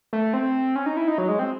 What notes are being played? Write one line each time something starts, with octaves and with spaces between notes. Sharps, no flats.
A3
C4
C#4
D#4
E4
D#4
F#3
G#3
C4